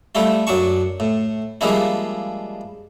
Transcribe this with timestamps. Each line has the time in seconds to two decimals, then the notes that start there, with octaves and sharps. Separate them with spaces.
0.15 G3 A3 E4 F4
0.47 F#2 F#3 D4 A5 C#6
1.00 A2
1.61 F3 G3 G#3 A#3 D4 E4